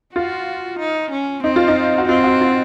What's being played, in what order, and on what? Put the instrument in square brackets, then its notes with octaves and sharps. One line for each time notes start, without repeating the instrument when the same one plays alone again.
[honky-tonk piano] F4 [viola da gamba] F#4
[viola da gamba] D#4
C#4
[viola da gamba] C4 [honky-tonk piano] D#4
[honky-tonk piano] F4
D#4
F#4
[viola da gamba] C4 [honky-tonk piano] F4
[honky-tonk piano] F#4
F4